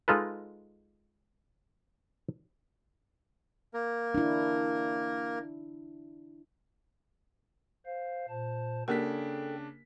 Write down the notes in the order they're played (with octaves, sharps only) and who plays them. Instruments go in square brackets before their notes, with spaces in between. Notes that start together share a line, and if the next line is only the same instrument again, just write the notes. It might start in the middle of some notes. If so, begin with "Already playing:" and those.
[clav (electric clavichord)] G#3 D#4 F4 A4 B4
[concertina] A#3 A#4
[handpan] D4 E4
[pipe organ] C5 F5
A#2 C5 A5
[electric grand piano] C#3 D4 B6 [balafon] A#3 G4 A#4 [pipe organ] A4 G5